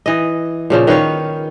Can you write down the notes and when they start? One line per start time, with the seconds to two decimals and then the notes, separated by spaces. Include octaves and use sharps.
0.06 E3 D#5
0.70 A#2 C#3 F3
0.87 D#3 B4 C#5 F5